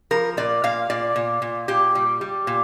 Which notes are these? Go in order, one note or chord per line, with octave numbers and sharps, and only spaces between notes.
F3 A#4
A#2 D5
A#2 F5
A#2 D5
A#2
A#2
A#2 G4
G3
G3
A#2